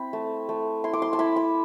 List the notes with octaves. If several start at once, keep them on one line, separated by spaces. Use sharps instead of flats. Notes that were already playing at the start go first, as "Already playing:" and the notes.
Already playing: C4 E4 B5
A3
A3
E4 C6
D6
C6
A5
E4 B5
B5